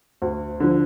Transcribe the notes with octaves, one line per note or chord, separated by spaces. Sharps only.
D2
D3 F3